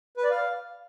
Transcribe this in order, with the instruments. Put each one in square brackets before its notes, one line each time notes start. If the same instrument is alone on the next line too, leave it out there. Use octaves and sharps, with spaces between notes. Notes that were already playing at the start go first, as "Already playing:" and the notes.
[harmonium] B4
D5
F5